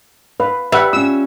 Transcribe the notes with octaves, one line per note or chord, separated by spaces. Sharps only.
B4 F5
G3 B4 E5 F#5
C#4 F4 E6